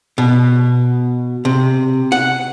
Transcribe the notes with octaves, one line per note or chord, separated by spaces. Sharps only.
B2
C3
F#5